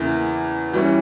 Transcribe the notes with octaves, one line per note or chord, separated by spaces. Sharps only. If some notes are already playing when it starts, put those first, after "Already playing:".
Already playing: E2 C#3 E3 A#3
E3 G3 C#4